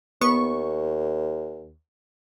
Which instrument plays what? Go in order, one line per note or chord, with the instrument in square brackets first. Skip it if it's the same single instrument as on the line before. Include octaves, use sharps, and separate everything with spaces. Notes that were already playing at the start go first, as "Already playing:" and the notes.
[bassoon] D#2 [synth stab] B3 C#6